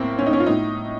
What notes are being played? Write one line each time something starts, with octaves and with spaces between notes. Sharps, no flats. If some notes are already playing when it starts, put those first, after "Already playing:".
Already playing: A2 A#3 C4
C#4
D#4
C#4
F4
A2 D#4